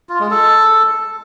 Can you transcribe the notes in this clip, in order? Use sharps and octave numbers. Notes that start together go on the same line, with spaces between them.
F4
G#3
A4